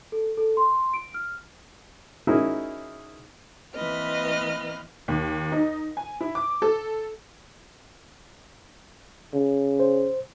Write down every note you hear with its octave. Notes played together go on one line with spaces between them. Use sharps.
A4
A4
C6
D7
F6
C#4 D#4 E4 F#4 G#4 A#4
E3 A#3 C4 B4 D#5 F6
D#2
D#4
G#5
E4
D6
A4
C#3
C5